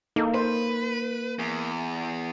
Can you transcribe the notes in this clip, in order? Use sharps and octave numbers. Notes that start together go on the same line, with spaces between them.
A#3 D#4 A4
B4 C5
E2